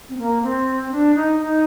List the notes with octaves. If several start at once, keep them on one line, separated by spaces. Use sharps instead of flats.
C4
A#3
C4
D4
D#4
D#4